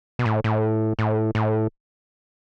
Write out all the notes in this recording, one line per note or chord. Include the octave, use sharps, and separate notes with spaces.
B2
A2
A2
A2
A2